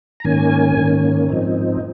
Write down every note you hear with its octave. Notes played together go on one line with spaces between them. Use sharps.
A#5
G#2 D#3 A#3 C#4 G#5
G#2 D#3 A#3 C#4
G#2 F3 C4 D#4